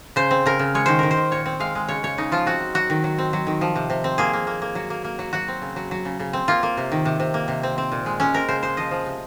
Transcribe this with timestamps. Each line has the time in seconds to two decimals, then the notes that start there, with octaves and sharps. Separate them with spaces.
0.16 C#3 C5
0.31 C4
0.46 C#3 A#4
0.59 C#3
0.75 G#3 C#5
0.86 D#3 C5
0.99 D#3 A#4
1.11 C5
1.17 D#3
1.31 A#2 C#5
1.46 C4
1.60 G#3 F5
1.75 G#3
1.89 C#3 C#5
2.03 C#3 C#5
2.18 C#3 D#4
2.32 F3 F4
2.46 C4 F#4
2.60 F#3
2.75 F#3 F#4
2.90 D#3
3.04 F#3
3.18 C4
3.33 F#3
3.47 D#3
3.61 F3
3.76 C3
3.90 C3
4.04 C4
4.18 A#3 G#4
4.33 A#3
4.47 A#3
4.62 A#3
4.75 F#3
4.90 A#3
5.04 A#3
5.19 F#3
5.33 F#3 F#4
5.48 C4
5.62 C#3
5.76 F#3
5.91 F#3
6.05 C#3
6.20 C#3
6.33 C4
6.48 A#3 F4
6.63 A#3
6.77 C3
6.92 D#3
7.05 C3
7.20 C3
7.34 A#3
7.48 C3
7.63 C4
7.78 C4
7.92 A#2
8.06 G#3
8.20 G#3 C#4
8.34 C4 A#4
8.48 C#3 C5
8.63 G#3 C5
8.77 F3 D#5
8.91 F3
9.06 C3